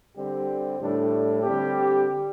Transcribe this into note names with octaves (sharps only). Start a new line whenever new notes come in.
D3 G3 C4 G4
A2 G3 D4 A4
D3 G3 C4 G4